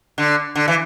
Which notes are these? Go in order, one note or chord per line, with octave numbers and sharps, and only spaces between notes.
D3
D3
E3